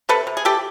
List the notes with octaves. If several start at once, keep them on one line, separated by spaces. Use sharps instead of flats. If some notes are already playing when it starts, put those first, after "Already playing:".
C3 A4 B4
C3
G#4
E3 G4 A4